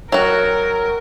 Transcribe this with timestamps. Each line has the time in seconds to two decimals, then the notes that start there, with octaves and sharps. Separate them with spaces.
0.12 F#3 F#4 A#4